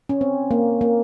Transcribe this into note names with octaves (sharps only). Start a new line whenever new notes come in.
C#4
C4
A#3
A#3